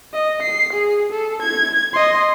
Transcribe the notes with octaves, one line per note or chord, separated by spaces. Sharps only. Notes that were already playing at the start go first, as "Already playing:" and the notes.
D#5
C7
G#4
A4
G#6
D#5 C6